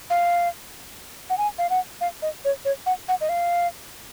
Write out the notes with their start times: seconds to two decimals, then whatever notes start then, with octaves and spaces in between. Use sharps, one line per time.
0.10 F5
1.30 F#5
1.38 G#5
1.58 F5
1.70 F#5
2.01 F5
2.22 D#5
2.45 C#5
2.65 C#5
2.86 F#5
3.08 F#5
3.21 D#5
3.29 F5